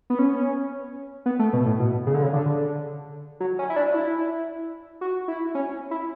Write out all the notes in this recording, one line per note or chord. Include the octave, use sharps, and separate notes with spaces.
B3
C#4
B3
A3
B2
A2
B2
C#3
D3
C#3
D3
F#3
C#4
E4
D4
E4
F#4
E4
C#4
E4